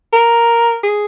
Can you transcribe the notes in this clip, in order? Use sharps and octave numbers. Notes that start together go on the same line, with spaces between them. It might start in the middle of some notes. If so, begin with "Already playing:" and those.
A#4
G#4